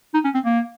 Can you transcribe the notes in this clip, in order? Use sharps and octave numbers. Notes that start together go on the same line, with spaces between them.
D#4
C#4
C4
A#3